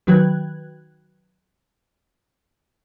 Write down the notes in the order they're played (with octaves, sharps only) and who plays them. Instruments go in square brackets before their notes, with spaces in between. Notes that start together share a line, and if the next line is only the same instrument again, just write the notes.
[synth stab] D#3 F#3 B4 G5 F#6 G#6